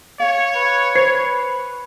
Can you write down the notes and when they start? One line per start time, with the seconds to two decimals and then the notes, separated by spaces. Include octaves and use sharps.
0.20 C#5 F5
0.55 B4
0.96 B4 C5 G#6 C7